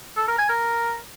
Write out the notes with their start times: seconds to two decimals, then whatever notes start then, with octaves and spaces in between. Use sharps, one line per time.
0.17 A4
0.28 A#4
0.39 G#5
0.49 A#4